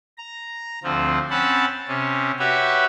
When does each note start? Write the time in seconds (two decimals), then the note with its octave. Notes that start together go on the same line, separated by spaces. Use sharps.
0.18 A#5
0.84 D2 F3 C4
1.30 C4 C#4 F#5 A5 B5
1.88 C3 C#4
2.39 F#4 G4 B4 C#5 E5